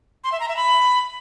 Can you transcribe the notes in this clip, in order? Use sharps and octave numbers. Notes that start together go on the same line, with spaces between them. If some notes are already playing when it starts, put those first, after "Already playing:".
C6
E5
A#5
E5
B5